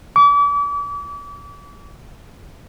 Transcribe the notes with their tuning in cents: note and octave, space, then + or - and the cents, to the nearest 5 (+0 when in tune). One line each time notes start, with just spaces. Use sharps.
D6 -40